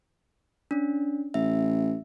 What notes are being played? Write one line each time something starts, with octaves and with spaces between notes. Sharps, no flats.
C#4 D4
A1 E5